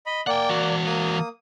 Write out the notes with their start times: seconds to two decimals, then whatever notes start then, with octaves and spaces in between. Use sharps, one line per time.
0.06 D#5 B5
0.27 A#3 D5 F#5 G5
0.49 E3 F#4
0.86 A#3 D#6